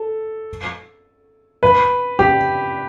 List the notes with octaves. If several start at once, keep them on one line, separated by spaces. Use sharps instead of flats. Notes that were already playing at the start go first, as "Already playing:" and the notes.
Already playing: A4
B4
G4